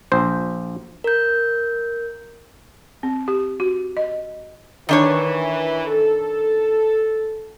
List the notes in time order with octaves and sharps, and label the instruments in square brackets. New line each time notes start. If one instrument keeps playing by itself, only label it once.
[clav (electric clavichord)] A#1 C5
[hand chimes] A#4 G6
[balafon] C4
G4
F#4
D#5
[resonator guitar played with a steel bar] D#3 D4 C#5 [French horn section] E3
[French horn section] A4